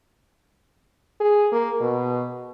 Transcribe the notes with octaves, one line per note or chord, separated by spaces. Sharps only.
G#4
A#3
B2